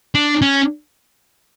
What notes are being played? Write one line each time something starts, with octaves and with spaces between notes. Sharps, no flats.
D4
C#4